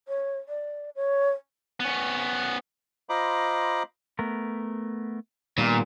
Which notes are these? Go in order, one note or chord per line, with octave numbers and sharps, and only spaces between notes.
C#5
D5
C#5
B3 C#4
F4 C5 D#5 A#5 B5 D6
A3 B3 A#4
A#2 D#3 G3 B3